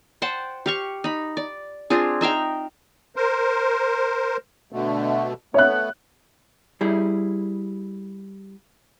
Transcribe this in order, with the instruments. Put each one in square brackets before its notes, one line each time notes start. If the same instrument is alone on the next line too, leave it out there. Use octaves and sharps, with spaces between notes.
[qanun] C5 F#5 G5 A5
G4 F5 C#6
D#4 B5
D5
C4 D4 F4 G#4
D#4 E5 F5 G5
[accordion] A#4 C5
B2 D3 A3
[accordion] A3 B3 [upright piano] C#5 E5 F#6
[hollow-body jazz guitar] G3 E4 G#4